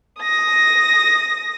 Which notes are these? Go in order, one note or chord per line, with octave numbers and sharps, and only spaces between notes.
D#6 A#6